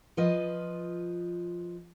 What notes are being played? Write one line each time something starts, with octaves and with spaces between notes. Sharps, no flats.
F3 F4 B4 D#5